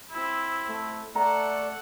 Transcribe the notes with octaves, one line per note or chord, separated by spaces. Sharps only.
C4 E4
A3
A3 A4 D5 F#5 A#5